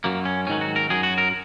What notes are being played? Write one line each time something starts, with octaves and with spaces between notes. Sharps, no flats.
F#2 F#3 A#3
C#4
G#2 D#3 F#3 C#4
F#4
A#4
F#2 F#3 G#4
F#4
A#4